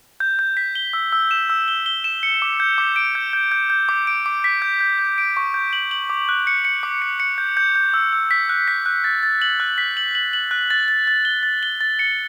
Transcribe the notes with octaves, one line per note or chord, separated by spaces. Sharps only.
G6
G6
B6
G7
E6
E6
E7
E6
G7
G7
E7
C#7
D6
G6
D6
D7
G6
G6
G6
G6
D6
D7
D6
B6
G6
G6
G6
D7
C#6
G6
F#7
F#7
D6
F#6
C#7
C#7
D6
C#7
C#7
G6
G6
G6
E6
E6
B6
F#6
B6
F#6
A6
A6
F#7
F#6
B6
F#7
F#7
F#7
F#6
A6
A6
A6
G7
A6
G7
A6
C#7